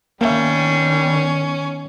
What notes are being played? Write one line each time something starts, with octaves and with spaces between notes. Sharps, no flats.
D#3 G3 A#3 B3 C#4 D4 E5